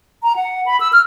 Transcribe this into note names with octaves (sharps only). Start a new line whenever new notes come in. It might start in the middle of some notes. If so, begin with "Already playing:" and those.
A#5
F#5
B5
E6
F6